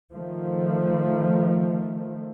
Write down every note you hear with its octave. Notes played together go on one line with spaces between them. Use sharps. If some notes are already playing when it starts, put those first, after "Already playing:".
D#3 F3 A3